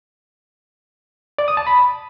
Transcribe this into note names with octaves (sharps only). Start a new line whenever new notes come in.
D5
D#6
A5
B5